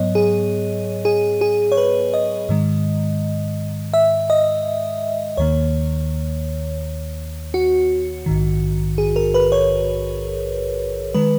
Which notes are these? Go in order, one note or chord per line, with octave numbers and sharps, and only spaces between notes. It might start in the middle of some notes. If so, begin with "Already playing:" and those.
Already playing: G#2 F#3 B3 C#5 D#5
G#4
G#4
G#4
C#5
B4
D#5
G#2 D#3 G#3
E5
D#5
D#2 D#3 A#3 C#5
F#4
A#1 G#2 D#3
G#4
A#4
B4
C#5
D#3 G#3 B4